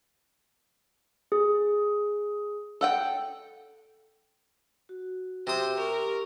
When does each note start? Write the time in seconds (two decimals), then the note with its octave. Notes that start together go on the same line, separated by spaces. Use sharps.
1.32 G#4
2.81 A4 F#5 G5
4.89 F#4
5.47 C3 C5 D#6
5.78 G4 A#4 C#6